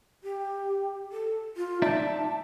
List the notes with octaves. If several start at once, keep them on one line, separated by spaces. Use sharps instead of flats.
G4
A4
F4
D#4 D5 E5 A5